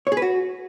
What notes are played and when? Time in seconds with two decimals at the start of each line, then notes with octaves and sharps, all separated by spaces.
0.07 C#5
0.12 G#4
0.17 B4
0.22 F#4